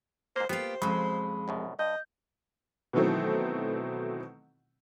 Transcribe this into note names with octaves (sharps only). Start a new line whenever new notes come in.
G#2 A#3 C5
A#3 B3 F4 G4 C5 F5
F2 C#3 F#3 G#3 B5
C2 F#2 B2
G2 D#5 G6
B2 D#3 E3 F#3 A3 C4